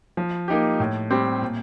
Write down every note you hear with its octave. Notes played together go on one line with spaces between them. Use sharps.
F3
A#3 D#4 G4
A2
G3 C4 G4
A#2